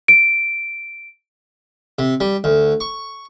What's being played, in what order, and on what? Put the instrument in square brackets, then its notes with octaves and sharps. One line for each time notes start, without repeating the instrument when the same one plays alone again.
[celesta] D7
[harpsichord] C3
G3
D2
C#6